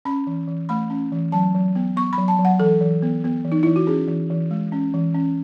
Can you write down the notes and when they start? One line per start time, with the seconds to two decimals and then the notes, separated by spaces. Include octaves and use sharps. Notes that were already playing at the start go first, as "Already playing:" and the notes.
0.05 C#4 B5
0.27 E3
0.48 E3
0.69 A3 B5
0.90 C#4
1.12 E3
1.32 F#3 A5
1.54 F#3
1.75 B3
1.96 B3 C#6
2.13 B5
2.18 F#3
2.28 A5
2.39 F#3
2.45 F#5
2.60 E3 A4
2.81 E3
3.02 B3
3.24 B3
3.45 E3
3.52 D#4
3.63 E3 E4
3.76 F#4
3.87 C#4 G#4
4.08 E3
4.30 E3
4.51 G#3
4.72 C#4
4.94 E3
5.15 C#4